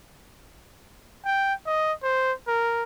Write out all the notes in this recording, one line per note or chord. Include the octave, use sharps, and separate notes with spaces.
G5
D#5
C5
A#4